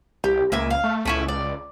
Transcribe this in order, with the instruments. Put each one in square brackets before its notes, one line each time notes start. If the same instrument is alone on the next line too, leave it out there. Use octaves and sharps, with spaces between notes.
[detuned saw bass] C2 [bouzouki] G4
[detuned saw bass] C#2 [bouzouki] A#3 E5 G#5
[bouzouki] F5
[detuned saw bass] A3
[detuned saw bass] C#2 [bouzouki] A3 C#4 E4
[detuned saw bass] C#2 [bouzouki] D5